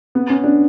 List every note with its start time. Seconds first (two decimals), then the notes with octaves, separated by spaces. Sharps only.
0.15 B3
0.30 C#4
0.44 D4